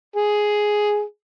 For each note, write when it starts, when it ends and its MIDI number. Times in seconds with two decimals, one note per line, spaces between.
0.16 1.02 68